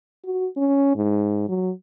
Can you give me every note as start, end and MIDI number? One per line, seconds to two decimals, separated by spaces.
0.24 0.46 66
0.57 0.93 61
0.96 1.47 44
1.49 1.71 54